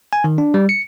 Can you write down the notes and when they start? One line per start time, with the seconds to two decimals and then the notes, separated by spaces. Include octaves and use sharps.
0.13 G#5
0.24 D#3
0.38 D4
0.54 G3
0.69 C#7